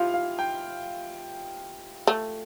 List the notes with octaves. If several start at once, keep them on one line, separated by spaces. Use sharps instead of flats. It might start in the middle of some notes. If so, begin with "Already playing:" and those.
Already playing: F3 E4 F4 G4 F5
F5
G5
A3